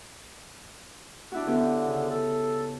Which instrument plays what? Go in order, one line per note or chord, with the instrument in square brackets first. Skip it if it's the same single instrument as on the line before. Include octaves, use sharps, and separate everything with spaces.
[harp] D4 E4 F#4
[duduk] D3 [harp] B3 C#4 G4
[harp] C#3
[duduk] A4